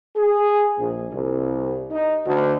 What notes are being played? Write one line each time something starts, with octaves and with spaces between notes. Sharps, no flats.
G#4
A#1
C2
D#4
D2